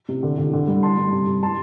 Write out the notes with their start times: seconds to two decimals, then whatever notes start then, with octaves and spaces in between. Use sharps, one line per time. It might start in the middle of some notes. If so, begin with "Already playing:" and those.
0.09 C3
0.23 D3
0.38 D3
0.53 D3
0.68 G2
0.82 G2 A5 C6
0.98 G2
1.12 C3
1.27 C3
1.43 A5 C6